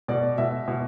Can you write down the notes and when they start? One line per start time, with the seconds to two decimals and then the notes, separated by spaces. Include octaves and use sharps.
0.08 B2 D5
0.38 B2 E5
0.68 B2